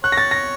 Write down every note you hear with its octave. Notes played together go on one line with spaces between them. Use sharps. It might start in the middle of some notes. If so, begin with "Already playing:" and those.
C#5 F#6
A#6
A6
A#6